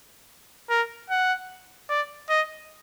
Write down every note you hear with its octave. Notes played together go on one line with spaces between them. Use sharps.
A#4
F#5
D5
D#5